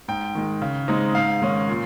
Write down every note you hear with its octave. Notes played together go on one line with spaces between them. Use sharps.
G#2 G5
D#3 G#3
C#3
G#3 C4 D#4
G#2 F5
D#3 G#3 C#4
A#2